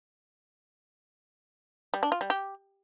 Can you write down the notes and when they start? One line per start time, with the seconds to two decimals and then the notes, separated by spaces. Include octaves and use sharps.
1.94 G3
2.03 D4
2.12 F4
2.21 G3
2.30 G4